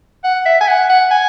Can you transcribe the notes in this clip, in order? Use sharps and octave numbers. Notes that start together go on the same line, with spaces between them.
F#5
E5
G#5
F#5
F#5
G#5